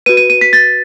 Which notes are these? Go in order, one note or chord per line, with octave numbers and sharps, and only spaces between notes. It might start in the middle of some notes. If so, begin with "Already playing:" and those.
F#4 B4 D#7
D#7
D#7
B6
A6